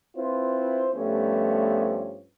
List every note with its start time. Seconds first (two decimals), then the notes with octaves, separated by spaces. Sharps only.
0.17 C4 E4 F4 B4 C5
0.95 G2 F3 A3 B3 C#4